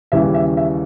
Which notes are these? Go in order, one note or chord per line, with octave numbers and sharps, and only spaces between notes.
D#2 C#3 E3 G3 E5
E5
E5